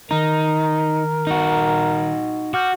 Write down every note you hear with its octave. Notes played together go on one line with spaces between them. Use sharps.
D#3 D#4 A#4 A#5
D#4 F#4
F#4 D6 F6 G6